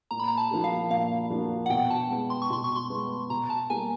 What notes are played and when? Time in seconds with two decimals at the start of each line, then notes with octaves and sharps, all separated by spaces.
0.11 A#2 A#5
0.20 B5
0.28 A#5
0.37 A5
0.51 F3 A#3 D4 F#4
0.64 F5
0.90 A#2 F5
1.30 F3 A#3 D4 F#4
1.66 F#5
1.70 B2 G5
1.90 A5
2.10 G#3 B3
2.30 C6
2.42 C#6
2.50 B2 C6
2.64 C#6
2.76 C6
2.90 G#3 B3
3.30 B2 A#5
3.50 A5
3.70 G3 A#3 G#5